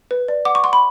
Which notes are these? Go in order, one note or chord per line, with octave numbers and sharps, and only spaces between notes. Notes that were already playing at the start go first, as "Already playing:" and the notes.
B4
D5
F#5 D6
C#6
F#5 C6
B5